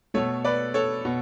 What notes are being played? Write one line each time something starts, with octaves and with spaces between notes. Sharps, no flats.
B2 A3 A4 C#5
B4 D5
A4 C#5
B2